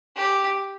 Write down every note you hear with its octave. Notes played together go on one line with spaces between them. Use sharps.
G4